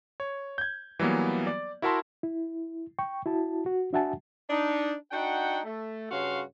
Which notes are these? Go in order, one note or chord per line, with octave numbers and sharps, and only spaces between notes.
C#5
G6 G#6
E3 F#3 G3 A#3 B3
D5
E4 F#4 A#4 E5 A5 C6
E4
G5 C#6
E4 F#4 A5
F#4
D4 F#4 E5 F#5 G#5 A5
D4 D#4
D4 D#4 F#4 F#5 G5
A3
G2 C#3 F#4 C#5 F5 C6